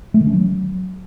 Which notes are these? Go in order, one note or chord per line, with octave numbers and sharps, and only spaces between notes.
A3
D#3
C#4
F#3